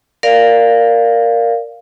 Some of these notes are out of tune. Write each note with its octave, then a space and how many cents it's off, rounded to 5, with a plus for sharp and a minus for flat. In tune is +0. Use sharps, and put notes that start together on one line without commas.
A#4 -5 D5 +0 F5 +0